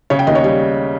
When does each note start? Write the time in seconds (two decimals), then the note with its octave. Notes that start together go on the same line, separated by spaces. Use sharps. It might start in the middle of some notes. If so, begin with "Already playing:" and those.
0.10 C#3 C#5
0.19 G5
0.27 D#2 D#5
0.35 C#5
0.44 G3